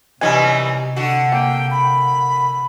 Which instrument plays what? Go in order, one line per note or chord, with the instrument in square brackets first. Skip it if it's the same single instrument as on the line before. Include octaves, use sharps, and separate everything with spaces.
[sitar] F#2 E3 G3 [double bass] C3 [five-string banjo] C#4 D#4 G#5
[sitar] D3 F#4
[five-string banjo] A#3 [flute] G5
[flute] B5